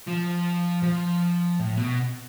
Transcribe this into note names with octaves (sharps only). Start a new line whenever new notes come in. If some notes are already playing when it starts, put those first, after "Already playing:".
F3
F3
A2
B2